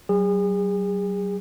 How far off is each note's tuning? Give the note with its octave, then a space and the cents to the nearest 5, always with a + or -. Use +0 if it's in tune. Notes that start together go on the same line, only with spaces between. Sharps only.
F#3 +35 G#4 -35